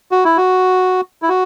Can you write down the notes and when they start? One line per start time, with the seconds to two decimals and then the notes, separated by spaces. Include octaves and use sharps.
0.11 F#4
0.25 E4
0.37 F#4
1.22 E4
1.29 F#4